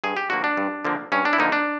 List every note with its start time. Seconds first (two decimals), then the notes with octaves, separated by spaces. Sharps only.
0.04 G2 G#4
0.17 G4
0.30 D3 F3 A#3 F#4
0.44 D4
0.57 G2
0.85 D3 F3 A#3
1.12 G2 C#4
1.25 D4
1.33 E4
1.38 D3 F3 A#3 D#4
1.52 D4